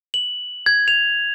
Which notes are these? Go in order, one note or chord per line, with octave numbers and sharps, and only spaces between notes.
F#7
G#6
F7